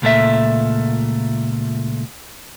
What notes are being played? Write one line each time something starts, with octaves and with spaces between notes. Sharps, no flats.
C#2 A#2 A3 E5